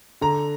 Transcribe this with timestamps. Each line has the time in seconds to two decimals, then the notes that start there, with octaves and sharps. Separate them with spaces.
0.21 D3 A#5